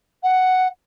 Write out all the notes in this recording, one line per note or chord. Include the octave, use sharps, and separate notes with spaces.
F#5